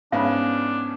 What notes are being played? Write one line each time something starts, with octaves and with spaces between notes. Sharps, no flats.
G#2 B3 C#4 D4 F5 B5